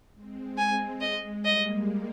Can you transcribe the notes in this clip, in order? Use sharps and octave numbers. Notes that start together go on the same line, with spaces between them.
G#3 C4
G#3 G#5
D#5
G3 A#3 D#5